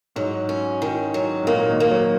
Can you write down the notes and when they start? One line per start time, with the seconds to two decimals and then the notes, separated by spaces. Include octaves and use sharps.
0.16 G#2 F#3
0.49 C#4
0.82 D#3
1.14 F#3
1.43 G#2
1.47 A#2 A#3
1.69 D#3
1.80 A#3
1.91 F#3